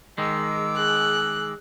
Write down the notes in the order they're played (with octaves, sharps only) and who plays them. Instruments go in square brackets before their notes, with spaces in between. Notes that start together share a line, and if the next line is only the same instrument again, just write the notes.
[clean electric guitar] D#3 G#3 [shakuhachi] G#4 [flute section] D6 E6
[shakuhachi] G#4 [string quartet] F#6